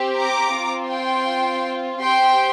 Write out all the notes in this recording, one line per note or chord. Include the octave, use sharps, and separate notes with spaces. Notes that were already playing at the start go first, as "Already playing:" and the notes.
Already playing: C4 G4
A#5 D6
C4 F4
G5 C6
C4 G4 G5 C6